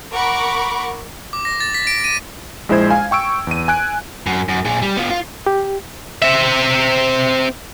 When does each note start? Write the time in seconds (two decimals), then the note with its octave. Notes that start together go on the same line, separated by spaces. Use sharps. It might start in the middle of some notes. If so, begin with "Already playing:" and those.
0.14 A#4 F#5 B5 C#6 D6
1.33 D6
1.45 A#6
1.61 A6
1.74 B6
1.87 D7
2.04 D#7
2.69 A#1 G#3 E4 C5 G#6
2.90 F5 G#5
3.11 G5 C#6 E6 D7
3.47 E2 D#7
3.68 G#5 F#6 D7
4.26 F#2
4.49 F#2
4.65 A#2 G#4
4.82 G3
4.97 B3 F4
5.10 F4
5.46 G4
6.22 C4 E5